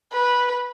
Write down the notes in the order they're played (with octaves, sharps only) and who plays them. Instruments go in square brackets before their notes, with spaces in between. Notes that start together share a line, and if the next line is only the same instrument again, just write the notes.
[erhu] B4